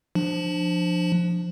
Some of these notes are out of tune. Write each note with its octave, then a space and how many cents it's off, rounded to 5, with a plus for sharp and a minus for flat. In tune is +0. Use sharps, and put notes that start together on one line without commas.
F3 +0 D4 +20